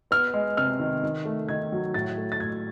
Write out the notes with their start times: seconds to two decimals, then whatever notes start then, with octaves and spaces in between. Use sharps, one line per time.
0.11 B3 F6
0.34 G#3
0.57 C3 F6
0.80 D#3
1.03 D#3
1.25 A3
1.49 D#3 G#6
1.72 F#3
1.94 A2 A6
2.18 A3
2.32 A6
2.40 A2 G#6